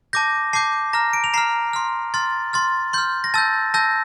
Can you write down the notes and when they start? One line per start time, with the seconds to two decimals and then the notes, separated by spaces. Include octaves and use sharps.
0.13 A5 D6 G6 A#6
0.53 A5 D6 G6 C7
0.93 A#5 F6 A#6
1.13 D7
1.24 F7
1.34 A#5 F6 C7
1.73 C6 F6
2.14 C6 F6 A6
2.53 C6 F6 A6
2.93 C6 F6 G6
3.24 A#6
3.34 A5 E6 G6 A6
3.74 A5 E6 G6 A#6